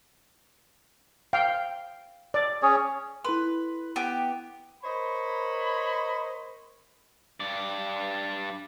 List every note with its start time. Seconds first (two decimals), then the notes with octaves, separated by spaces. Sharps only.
1.33 F5 G5
2.34 D5
2.63 C#4 G#4 C#5
3.24 E4 A4 B4 C6
3.96 B3 G4 D6
4.84 A#4 C5 C#5 D#5 B5
7.40 G2 D5